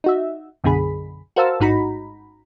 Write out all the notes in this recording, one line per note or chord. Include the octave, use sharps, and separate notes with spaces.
D#4 F#4 E5
B1 F#2 B2 D3 G#4 B5
F#4 A#4 C5 F5 A5 E6
A1 G#2 D#4 F#4 A#5 B5